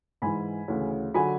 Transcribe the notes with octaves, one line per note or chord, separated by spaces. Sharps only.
G#2 E3 G#5 B5
D2 C#3 E3
D3 F#3 G#5 B5